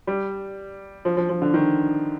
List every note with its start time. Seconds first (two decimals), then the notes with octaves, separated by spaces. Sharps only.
0.07 G3
1.05 F3
1.17 F3
1.29 F3
1.42 D3
1.54 D#3